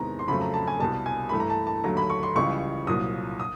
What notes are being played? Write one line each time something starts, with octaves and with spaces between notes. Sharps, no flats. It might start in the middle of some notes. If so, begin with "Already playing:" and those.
Already playing: E2 C3 D#3 G#3 A#5
C6
F2 C#3 F#3 A3 B5
A#5
A5
G#5
C2 B2 G3 A5
G#5
G2 E3 A3 B5
A#5
A5
A5
D#2 D3 F#3 A3 A#5
B5
C#6
C6
C#2 C#3 E3 G3 C#6
C2 A#2 F#3 D#6
D#6